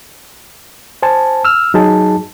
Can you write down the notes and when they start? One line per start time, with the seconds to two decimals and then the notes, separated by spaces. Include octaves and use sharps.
1.03 C5 G#5 A5
1.45 E6 F6
1.74 F#3 D#4 G#4 A5